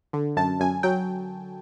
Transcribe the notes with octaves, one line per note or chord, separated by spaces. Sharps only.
D3
F#2 A5
F#2 G#5
F#3 G5